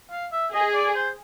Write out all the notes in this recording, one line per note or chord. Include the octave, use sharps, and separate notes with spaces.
F5
E5
G#4 D#5
D5
C5